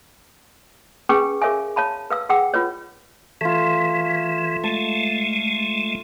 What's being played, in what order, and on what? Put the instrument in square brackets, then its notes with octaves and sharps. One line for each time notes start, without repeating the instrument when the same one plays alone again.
[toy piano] C#4 G#4 B4 G5 G#5 C#6
G#4 A#4 C#5 E5 F5 G#5
C#5 F5 A5 B5
B4 F5 E6
G#4 F#5 G5 E6
F4 B4 C#5
[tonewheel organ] E3 [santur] A3 F4
[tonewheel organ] G#3 A3 [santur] A5